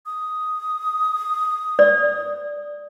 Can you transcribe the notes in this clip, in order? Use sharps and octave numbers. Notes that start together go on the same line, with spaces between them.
D#6
D5